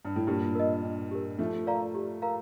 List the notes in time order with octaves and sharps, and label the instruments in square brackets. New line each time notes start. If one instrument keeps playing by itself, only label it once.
[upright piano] G2
A2
[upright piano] G2 A#2 [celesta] G4
[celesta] A#4 D#5
D4
G4 A#4
[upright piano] F3 A3 [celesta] D#4
[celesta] A#4 D5 F5 A#5
G4
A#4 F5 A#5